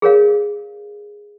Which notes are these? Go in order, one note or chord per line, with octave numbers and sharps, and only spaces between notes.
G#4 A#4 C#5 F5